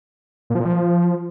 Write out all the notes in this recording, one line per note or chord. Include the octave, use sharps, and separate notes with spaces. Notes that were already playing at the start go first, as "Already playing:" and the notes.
A#2
F3
A#2
F3